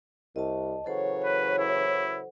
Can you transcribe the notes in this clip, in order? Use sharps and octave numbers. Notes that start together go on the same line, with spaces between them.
C2 D#5 A5
C#3 E3 F#3 A4 C5 C#5 F#5
B4
E4